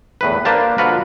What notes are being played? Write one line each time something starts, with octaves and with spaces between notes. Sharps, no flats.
E2 A2 B4
A#3 D4 B4 C5 F5 A5
D3 F3 F4 F#4 A#4 B4